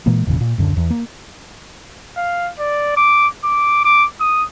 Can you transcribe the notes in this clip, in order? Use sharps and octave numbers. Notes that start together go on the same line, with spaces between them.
A#2 E3 G#3 A#3
G1 E2 A#2 C#3
A#2
D1 F#2 D3
E2
A#3
F5
D5
D6
D6
D6
D#6